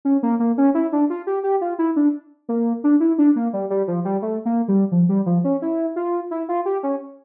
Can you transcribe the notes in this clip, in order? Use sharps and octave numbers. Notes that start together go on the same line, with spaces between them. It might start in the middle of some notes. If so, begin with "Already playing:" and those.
C#4
A#3
A#3
C#4
E4
D4
F4
G4
G4
F4
E4
D4
A#3
D4
E4
D4
A#3
G3
G3
F3
G3
A3
A#3
G3
F3
G3
F3
C#4
E4
F4
E4
F4
G4
C#4